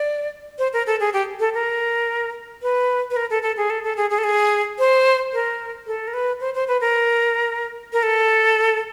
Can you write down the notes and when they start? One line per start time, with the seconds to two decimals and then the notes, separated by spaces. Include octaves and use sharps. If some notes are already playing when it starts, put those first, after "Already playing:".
Already playing: D5
0.59 C5
0.73 A#4
0.87 A4
1.00 G#4
1.13 G4
1.40 A4
1.54 A#4
2.62 B4
3.10 B4
3.16 A#4
3.30 A4
3.43 A4
3.57 G#4
3.70 A4
3.84 A4
3.97 G#4
4.10 G#4
4.18 A4
4.24 G#4
4.79 C5
5.33 A#4
5.87 A4
6.08 A#4
6.14 B4
6.40 C5
6.55 C5
6.68 B4
6.81 A#4
7.93 A#4
8.03 A4